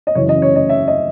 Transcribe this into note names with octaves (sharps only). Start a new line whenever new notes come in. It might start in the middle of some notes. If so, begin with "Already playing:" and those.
D#5
F#2 C#3 E3 C#5
D#5
C#5
D#5
E5
D#5